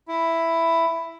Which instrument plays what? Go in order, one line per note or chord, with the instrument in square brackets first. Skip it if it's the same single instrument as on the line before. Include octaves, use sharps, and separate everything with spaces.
[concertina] E4